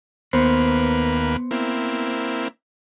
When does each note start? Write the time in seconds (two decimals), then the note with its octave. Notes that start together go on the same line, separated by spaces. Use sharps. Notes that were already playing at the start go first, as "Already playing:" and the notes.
0.33 D#2 A#3 B3 B4 C5
1.51 A#3 C4 E4